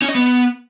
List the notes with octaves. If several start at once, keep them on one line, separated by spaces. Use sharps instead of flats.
C#4
D#5
B3